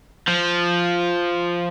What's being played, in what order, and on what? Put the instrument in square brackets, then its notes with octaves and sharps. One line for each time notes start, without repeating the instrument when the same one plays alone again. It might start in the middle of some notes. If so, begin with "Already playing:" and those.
[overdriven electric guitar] F3